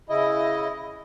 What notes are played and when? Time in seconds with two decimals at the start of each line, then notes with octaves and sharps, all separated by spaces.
0.09 C#3 E4 D#5